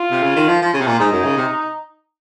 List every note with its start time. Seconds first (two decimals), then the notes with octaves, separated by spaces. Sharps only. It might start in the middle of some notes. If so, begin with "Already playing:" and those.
Already playing: F4
0.11 C3
0.23 C#3
0.36 D#3
0.48 F3
0.61 F3
0.74 C#3
0.81 C3
0.86 A#2
0.99 G#2 D#4
1.12 F#2
1.24 C#3
1.37 C3